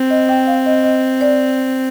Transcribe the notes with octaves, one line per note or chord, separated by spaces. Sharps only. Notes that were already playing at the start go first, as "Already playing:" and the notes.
Already playing: C4
D#5
G5
F5
D#5
D#5
D5